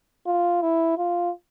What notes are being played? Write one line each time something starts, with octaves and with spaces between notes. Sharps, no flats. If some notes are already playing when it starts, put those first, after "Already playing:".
F4
E4
F4